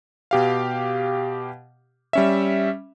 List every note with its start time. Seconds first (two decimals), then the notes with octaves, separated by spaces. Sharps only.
0.31 B2 G4 F5
2.13 G3 C#4 E5